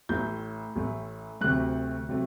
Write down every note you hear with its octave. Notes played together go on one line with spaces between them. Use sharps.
A1 A2 A3 G6
A1 A2 A3
D2 C3 F#3 A3 F#6
C3 F#3 A3